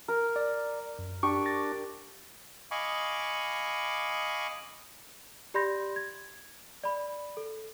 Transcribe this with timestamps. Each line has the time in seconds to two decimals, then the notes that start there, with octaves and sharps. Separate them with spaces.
0.08 A#4
0.36 D5
0.99 F#2
1.23 D4 G4 C#6
1.46 D6 A6 A#6
2.71 D#5 F5 G#5 B5 C#6 D6
5.54 G4 D5 B5 C6 G6 A#6
5.96 G#6
6.84 D5 B5
7.37 A4